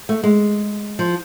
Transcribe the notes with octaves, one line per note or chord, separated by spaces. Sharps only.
A3
G#3
F3